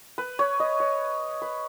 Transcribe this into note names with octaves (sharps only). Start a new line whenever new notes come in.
B4
C#5
D#5
C#5
B4